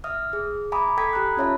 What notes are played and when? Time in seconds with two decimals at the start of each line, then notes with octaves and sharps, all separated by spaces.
0.04 E5 D#6 F6
0.33 G#4
0.72 E5 G#5 A#5 B5 D6 D#6
0.97 A4 G5 G#5 D#6 G#6 B6
1.13 G4 A#5 B5 F#6
1.37 C#4 F4 C#5 E5 A5 B5